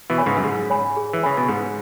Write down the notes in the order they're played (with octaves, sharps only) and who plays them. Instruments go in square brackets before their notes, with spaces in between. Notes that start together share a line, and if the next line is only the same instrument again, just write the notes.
[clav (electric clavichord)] B2 E3
[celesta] C#5 G#5 B5
[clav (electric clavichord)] G#2 C#3
F#2
[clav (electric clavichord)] G#2 [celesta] G#4
[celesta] C#5 G#5 B5
G#4
[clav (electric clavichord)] E3
[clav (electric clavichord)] C#3 [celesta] C#5 G#5 B5
[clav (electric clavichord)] B2
[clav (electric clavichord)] G#2 [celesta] G#4